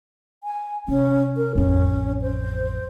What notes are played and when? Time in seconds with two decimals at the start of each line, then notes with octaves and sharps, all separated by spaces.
0.44 G#5
0.88 C3 C#4
1.37 A#4
1.55 A1 F2 C#4
2.22 C5